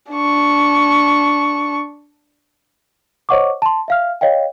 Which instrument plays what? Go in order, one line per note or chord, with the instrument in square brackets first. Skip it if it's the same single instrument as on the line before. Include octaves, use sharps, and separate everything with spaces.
[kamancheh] D4 C#6
[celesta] C5 C#5 D#5 F#5 C#6 D6
A5 C6
E5 F5 F6
C#5 D#5 F5 G5